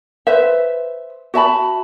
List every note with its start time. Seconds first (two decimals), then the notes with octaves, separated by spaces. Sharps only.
0.27 B4 C5 E5
1.34 F#4 E5 A5 B5